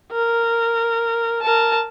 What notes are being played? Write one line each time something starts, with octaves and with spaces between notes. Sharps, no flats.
A#4
A#4 A5